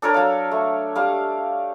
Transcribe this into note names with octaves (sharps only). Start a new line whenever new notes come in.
D4 A4 A#4 C#5
F#3 F5
A3
G3 F5